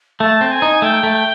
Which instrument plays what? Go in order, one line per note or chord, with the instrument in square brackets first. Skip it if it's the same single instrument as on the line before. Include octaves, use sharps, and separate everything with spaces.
[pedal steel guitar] A3 [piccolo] A5
[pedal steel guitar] C4
[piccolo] G#5
[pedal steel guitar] D#4
[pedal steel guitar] A3 [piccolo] G5
[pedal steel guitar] A3